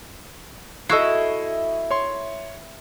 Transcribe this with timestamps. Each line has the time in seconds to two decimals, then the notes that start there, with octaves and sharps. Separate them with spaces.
0.89 E4 F#4 A4 D#5 C#6 C7
1.91 C#5 C6